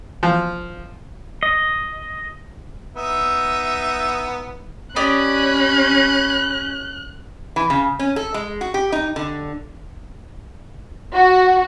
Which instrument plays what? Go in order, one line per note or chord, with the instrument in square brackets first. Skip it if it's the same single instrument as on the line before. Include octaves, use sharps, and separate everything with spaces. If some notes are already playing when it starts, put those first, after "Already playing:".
[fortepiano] F3
[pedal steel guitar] D#5
[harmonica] B3 D#4 E5
[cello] C#4 [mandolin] G4 D5 D#5 [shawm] B5 [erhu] F#6
[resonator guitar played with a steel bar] E3
C#3
C#4
A4
G#3
F#4
G4
D#4
D3
[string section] F#4